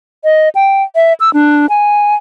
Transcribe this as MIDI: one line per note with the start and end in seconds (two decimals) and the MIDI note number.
0.24 0.49 75
0.55 0.83 79
0.95 1.13 76
1.20 1.32 88
1.34 1.66 62
1.69 2.15 80